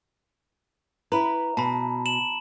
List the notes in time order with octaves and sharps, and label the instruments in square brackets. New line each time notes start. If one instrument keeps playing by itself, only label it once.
[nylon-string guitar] E4 B4 [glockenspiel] A#5
[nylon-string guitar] B2 [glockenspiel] A5 B5
[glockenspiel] E7 F#7